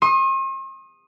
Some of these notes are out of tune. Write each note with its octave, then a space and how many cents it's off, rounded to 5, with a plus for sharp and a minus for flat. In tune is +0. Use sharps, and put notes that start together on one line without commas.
C6 +45 D#6 +0